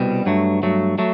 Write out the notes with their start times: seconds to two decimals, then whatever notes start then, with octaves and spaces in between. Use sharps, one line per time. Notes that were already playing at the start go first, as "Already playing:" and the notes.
Already playing: C2 B2 G3
0.26 G2 F#3 A3
0.63 G2 F#3 A3
0.98 F#3 A3